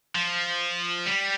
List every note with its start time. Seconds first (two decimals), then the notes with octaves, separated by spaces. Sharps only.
0.15 F3
1.06 G3